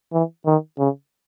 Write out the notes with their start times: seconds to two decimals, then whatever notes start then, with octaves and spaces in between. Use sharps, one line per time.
0.13 E3
0.46 D#3
0.79 C#3